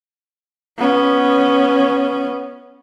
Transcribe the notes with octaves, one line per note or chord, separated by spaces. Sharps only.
B3 C#4